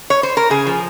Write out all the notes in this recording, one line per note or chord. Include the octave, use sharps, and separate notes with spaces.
C#5
C5
A#4
C#3 G#4
F3